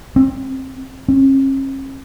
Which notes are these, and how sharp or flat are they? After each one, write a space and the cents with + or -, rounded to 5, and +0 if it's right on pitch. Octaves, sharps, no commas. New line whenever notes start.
C4 +20
C#4 -45